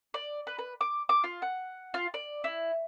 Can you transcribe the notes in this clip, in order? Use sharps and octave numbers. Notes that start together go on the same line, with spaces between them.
D5
B4
B4
D6
D6
F4
F#5
F4
D5
E4